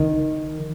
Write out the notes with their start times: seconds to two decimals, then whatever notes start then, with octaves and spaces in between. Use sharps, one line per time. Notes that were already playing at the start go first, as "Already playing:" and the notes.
Already playing: D#3